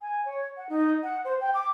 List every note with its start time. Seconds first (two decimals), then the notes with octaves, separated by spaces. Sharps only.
0.01 G#5
0.25 C#5
0.56 F#5
0.69 D#4
1.03 F#5
1.24 C5
1.40 G5
1.54 D6